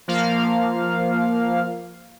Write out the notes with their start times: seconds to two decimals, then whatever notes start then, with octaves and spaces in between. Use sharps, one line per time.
0.08 F3 A#3 F5